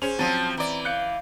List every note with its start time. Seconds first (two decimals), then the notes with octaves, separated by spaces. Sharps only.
0.02 C#4 G#4 C5 F7
0.19 F3 F#3 C4 A5 A6 D#7
0.57 E3 D5 A#5
0.85 F5 F#6 G6 C#7